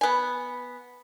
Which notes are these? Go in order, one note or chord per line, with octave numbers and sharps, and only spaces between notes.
B3 G#5